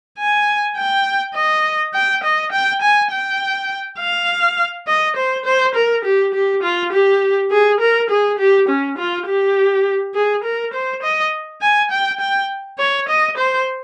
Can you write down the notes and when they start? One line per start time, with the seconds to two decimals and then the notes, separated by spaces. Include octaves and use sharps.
0.18 G#5
0.76 G5
1.35 D#5
1.94 G5
2.23 D#5
2.52 G5
2.82 G#5
3.11 G5
3.99 F5
4.87 D#5
5.16 C5
5.45 C5
5.75 A#4
6.04 G4
6.34 G4
6.63 F4
6.92 G4
7.51 G#4
7.80 A#4
8.10 G#4
8.39 G4
8.68 C#4
8.98 F4
9.27 G4
10.15 G#4
10.44 A#4
10.73 C5
11.03 D#5
11.61 G#5
11.91 G5
12.20 G5
12.79 C#5
13.09 D#5
13.37 C5